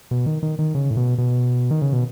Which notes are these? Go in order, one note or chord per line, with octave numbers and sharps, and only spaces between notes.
B2
D#3
D#3
D#3
C#3
A2
B2
B2
D#3
C#3
B2